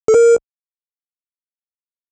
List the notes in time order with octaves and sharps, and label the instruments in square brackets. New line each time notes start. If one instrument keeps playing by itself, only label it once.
[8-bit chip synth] A4
A#4